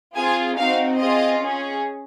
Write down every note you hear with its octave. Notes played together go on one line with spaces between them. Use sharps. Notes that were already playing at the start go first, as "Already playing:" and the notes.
C4 F4 G#4 G#5
C4 D#4 F#4 F5
C4 F4 G#4 D#5
C#4 G#4